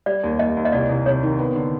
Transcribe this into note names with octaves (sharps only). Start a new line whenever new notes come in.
G3 D5
D#2
D#2 D#5
D#2
D#5
C2 D5
C2
C3 C#5
D#3
B3
D3